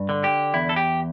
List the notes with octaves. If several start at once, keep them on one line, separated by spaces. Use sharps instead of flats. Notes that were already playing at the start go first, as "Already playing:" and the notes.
Already playing: G2
D3
G4
E2 E4
A4
G4